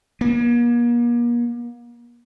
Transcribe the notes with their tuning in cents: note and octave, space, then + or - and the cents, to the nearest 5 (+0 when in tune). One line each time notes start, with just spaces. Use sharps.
A#3 +40